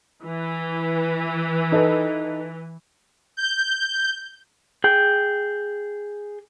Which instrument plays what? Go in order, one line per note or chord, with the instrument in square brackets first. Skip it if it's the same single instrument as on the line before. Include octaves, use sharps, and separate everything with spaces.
[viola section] E3
[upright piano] D#4 A4 B4
[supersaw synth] G6
[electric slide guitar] G#4 G5